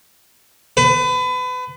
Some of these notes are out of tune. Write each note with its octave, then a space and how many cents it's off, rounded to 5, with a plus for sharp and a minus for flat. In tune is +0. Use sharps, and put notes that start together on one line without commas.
B4 +30